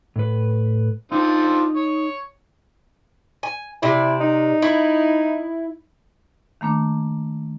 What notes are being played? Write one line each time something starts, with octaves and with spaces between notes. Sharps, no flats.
A2 B4
C4 D4 D#4 F4
C#5
G#5
C3 E4 D5
D#4
E4
D#3 A3 A#3 D4